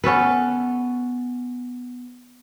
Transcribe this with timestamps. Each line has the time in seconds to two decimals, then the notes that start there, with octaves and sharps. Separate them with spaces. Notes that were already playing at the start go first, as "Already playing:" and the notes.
0.04 B3 C#4 A4 B4